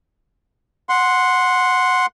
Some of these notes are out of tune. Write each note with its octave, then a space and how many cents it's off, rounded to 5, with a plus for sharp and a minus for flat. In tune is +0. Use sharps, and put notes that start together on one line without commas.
F#5 -10 C6 +0